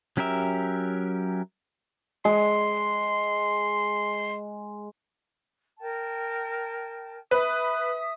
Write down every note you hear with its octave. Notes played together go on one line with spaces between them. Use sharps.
F#3 C#4 G4 A#4 E5
G#3 C6
A#4 G5 A5
B4 E5 D#6